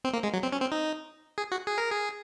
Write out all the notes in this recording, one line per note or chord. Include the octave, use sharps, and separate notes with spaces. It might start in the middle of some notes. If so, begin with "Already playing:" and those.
C4
A#3
G#3
F#3
C4
C#4
C4
D#4
G#4
F#4
G#4
A#4
G#4